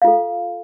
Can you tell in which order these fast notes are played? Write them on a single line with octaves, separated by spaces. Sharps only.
F5 F4 A4